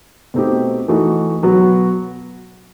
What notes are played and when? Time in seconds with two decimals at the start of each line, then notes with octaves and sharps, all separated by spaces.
0.34 B2 A3 C4 D#4 G4
0.88 E3 A3 D#4 F#4
1.43 B2 F#3 B3 F#4